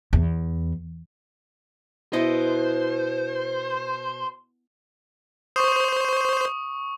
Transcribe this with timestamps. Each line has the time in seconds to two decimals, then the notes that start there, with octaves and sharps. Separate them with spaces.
0.13 E2
2.13 B2 E4 C5 D#5
5.56 C5 C#6 D#6